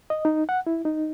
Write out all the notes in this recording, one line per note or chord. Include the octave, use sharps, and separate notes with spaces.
D#5
D#4
F#5
E4
D#4